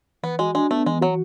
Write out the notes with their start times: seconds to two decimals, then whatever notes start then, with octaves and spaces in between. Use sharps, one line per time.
0.23 E3 B3
0.39 G#3 F#4
0.55 G#3 D4
0.71 A3 B3
0.86 E3 G#3
1.01 F#3 F#4